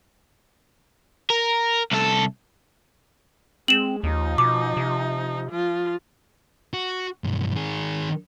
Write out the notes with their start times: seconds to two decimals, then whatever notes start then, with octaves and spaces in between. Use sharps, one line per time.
1.30 A#4
1.92 C2 A4
3.68 G#3 C4 E7 F#7
4.03 D#2 F3 D#4
4.38 B2 D6
4.77 C3
5.50 F3 F4
6.74 F#4
7.24 B1 G2
7.56 D#3 G#4